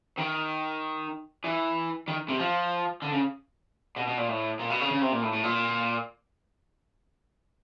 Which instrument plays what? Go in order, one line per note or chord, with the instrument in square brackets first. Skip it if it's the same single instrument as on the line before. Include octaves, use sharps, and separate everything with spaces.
[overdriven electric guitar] D#3
E3
D#3
C3
F3
D3
C#3
B2
B2
A#2
A2
A#2
B2
C#3
C#3
C3
A#2
A2
A2
A#2